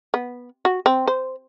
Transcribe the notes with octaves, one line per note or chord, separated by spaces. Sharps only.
B3
F#4
C4
C5